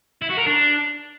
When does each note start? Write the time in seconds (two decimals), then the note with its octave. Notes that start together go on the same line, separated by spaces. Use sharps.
0.22 E4
0.30 F#4
0.38 A#4
0.46 D4